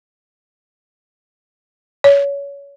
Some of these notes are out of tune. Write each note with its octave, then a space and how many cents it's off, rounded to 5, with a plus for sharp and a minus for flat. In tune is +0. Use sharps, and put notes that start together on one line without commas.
C#5 +25